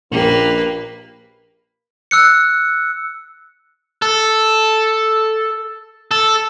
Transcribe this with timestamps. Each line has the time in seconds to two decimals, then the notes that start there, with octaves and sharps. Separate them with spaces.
0.12 A#1 A#2 A#3 C#4 G4 B4
2.11 E6 F#6 C#7
4.02 A4
6.11 A4